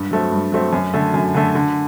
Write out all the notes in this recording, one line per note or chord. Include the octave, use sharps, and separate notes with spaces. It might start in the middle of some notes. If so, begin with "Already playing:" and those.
Already playing: G2
F#3 A3 C4
G2
F#3 A3 C4
F#2
D3 A3
F#2
D3 A3
D3